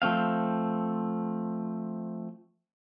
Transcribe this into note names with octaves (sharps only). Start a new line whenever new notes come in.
F3 A3 C4 F5